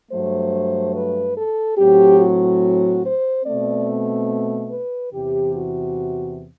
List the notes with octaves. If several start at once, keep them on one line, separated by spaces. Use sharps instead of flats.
G2 F#3 A3 C5
B4
A4
A2 F#3 C4 G4
F#4
C5
B2 A3 C4 D5
B4
E2 C3 E3 G4
F#4